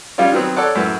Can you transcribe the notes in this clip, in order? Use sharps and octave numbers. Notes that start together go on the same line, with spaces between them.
G3 C#4 F4 C#5 D5
D#3 F#3 B3 C4
A4 C#5 D5 F#5
F#2 A2 E3